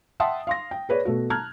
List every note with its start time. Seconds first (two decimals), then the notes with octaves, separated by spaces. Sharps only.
0.20 E5 F#5 G5 A5 C6 D#6
0.47 F5 C6 A#6
0.71 G5
0.89 G#4 B4 C#5 D5
1.05 B2 A3 F#4
1.30 A5 A#5 F6 F#6 G#6